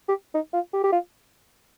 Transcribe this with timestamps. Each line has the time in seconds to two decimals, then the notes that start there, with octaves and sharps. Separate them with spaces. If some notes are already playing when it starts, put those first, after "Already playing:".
0.08 G4
0.34 D#4
0.53 F4
0.73 G4
0.83 G4
0.92 F4